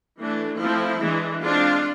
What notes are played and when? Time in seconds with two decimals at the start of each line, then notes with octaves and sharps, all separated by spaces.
0.19 E3 A3 D4
0.60 F3 A3 C4 E4
1.01 E3 G#3 D4
1.42 G#3 C4 D4 F4